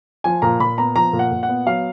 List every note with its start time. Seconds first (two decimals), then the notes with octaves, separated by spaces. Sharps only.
0.24 F3 G#5
0.42 A#2 A#5
0.60 A#2 B5
0.78 B3 A#5
0.95 F3 A#5
1.13 A#2
1.19 F#5
1.32 A#2
1.43 F#5
1.49 B3
1.66 F#3 F5